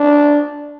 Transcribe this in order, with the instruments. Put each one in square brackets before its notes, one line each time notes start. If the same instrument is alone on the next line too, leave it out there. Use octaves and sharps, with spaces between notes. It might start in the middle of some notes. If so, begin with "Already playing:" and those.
Already playing: [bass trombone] D4